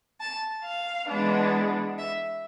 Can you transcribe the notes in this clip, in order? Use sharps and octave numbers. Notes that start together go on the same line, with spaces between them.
A5
F5
E3 G#3 B3 D4
E5